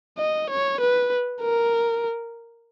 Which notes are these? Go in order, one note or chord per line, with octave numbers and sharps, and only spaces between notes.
D#5
C#5
B4
A#4